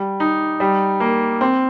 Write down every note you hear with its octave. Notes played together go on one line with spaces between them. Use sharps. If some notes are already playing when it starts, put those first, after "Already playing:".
Already playing: G3
D#4
G3
A#3
C4